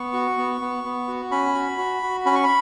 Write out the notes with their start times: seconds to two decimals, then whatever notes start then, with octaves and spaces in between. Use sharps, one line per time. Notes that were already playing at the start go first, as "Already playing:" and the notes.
Already playing: B3 C#6
0.13 F#4
0.37 B3
0.61 B3
0.84 B3
1.07 F#4
1.31 C#4 B5
1.54 F#4
1.78 F#4
2.02 F#4
2.26 C#4 B5
2.35 C#6
2.44 B5